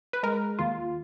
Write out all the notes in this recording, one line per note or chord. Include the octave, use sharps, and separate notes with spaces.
B4
G#3 A#4
D#2 F4